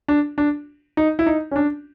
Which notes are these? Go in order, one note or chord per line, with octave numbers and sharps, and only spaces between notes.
D4
D4
D#4
E4
D#4
C#4
D4